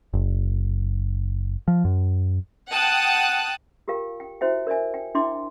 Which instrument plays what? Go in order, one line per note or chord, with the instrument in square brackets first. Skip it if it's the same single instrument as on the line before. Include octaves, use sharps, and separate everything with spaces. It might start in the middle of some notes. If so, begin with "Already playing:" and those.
[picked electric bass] F#1
F3
F#2
[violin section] F#5 G5 A5 D#6 F#6
[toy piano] F4 G4 A#4 F5 G5
G5
E4 F#4 C5 E5 G5
A#4 D5 E5 G#5
G5
D4 E4 E5 G5 C6 D6